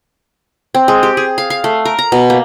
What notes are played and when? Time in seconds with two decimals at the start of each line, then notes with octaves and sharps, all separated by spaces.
0.74 C4
0.88 G#3
1.03 G4
1.17 G#4
1.38 F5
1.50 F5
1.64 A3
1.85 A#4
1.99 A#5
2.12 B2
2.30 A#3